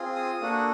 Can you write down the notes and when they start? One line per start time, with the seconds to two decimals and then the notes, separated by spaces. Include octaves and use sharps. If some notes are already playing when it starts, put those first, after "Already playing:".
Already playing: C4 F4 G#4
0.15 D#6
0.41 A#3 D4 F#4 A4